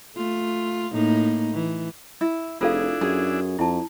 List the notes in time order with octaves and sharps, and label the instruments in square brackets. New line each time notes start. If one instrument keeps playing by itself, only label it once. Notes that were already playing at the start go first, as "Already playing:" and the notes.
[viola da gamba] A3 F4
A2 A#3 D#4
E3
[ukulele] E4
[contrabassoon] F1 [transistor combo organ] D4 E4 [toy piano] F4 A4 F5 [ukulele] G#4
[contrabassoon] F#2 [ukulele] G#4
[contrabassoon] F2 [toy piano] E4 A5